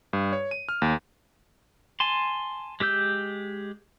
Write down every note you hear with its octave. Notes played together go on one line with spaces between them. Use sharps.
G2
C#5
D#7
F6
D#2
G#5 A5 C6
G#3 G4 E6 G6